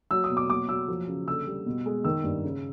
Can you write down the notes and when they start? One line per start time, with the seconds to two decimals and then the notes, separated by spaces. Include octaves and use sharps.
0.11 F#3 E6
0.24 D#6
0.30 B2
0.37 D6
0.49 F#3 D6
0.68 F#3 E6
0.88 F3
1.08 C#3
1.28 D3 E6
1.47 G3
1.66 B2
1.86 G#3
2.04 D#3 E6
2.24 G2
2.44 C#3